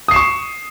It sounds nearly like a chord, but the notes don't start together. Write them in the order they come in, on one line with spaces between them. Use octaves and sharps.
D#6 C7 E7 C#6